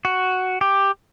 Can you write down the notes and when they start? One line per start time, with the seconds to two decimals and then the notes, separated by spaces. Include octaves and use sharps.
0.05 F#4
0.61 G4